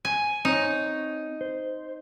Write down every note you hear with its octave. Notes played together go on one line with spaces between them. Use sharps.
G#5
C4 D#4 C#5
C5